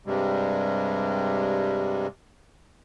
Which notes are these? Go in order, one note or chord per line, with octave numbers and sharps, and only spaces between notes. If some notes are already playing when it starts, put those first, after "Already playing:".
G2 C3 G3 G#3